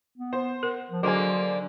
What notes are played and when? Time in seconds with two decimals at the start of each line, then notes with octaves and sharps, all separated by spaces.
0.17 B3
0.33 C5
0.63 A#4 F#5
0.90 F3
1.03 D3 F#3 A#3 F#4 G#4 C5